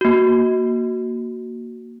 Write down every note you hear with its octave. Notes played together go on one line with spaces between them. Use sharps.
A#3 F#4